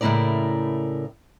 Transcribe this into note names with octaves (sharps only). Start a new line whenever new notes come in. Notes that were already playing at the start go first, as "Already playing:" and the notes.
A2 C#3 A#3 E4 A#4 D5